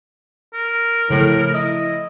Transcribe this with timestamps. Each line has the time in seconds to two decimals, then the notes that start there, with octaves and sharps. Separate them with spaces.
0.54 A#4
1.10 A2 C#3 F3 A3
1.54 E4 D#5